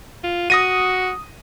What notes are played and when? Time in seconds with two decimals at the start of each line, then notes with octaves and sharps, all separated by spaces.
0.23 F4
0.50 F#4 D#6 A#6 D#7